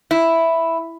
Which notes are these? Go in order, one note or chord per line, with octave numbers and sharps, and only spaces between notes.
E4